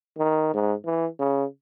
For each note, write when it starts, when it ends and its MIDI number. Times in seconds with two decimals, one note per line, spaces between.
0.18 0.49 51
0.54 0.74 44
0.85 1.07 52
1.19 1.45 49